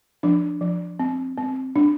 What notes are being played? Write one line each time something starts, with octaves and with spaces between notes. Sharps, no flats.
F3 D4
F3
C4
C4
D4